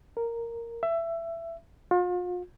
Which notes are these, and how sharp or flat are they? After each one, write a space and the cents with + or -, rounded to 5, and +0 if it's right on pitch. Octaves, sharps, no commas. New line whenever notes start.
A#4 -5
E5 +20
F4 +40